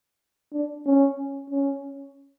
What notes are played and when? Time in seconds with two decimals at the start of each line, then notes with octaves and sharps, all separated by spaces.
0.53 D4
0.86 C#4
1.50 C#4